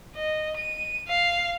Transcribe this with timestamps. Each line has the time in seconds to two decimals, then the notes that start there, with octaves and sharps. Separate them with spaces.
0.15 D#5
0.56 D#7
1.08 F5